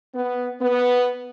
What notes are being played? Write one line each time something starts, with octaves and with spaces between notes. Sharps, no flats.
B3
B3